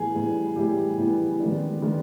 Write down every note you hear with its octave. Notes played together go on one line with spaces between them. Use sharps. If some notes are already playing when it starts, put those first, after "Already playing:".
Already playing: A2 E3 G3 B3 G#4
A2 E3 G3 B3
A2 E3 G3 B3 G4
A2 E3 G3 B3
D#3 G#3 B3 D4
D#3 G#3 B3 D4